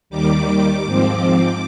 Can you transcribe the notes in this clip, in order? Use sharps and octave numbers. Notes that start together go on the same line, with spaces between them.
D#2 D#3 G3 D6
G#2 F3 C4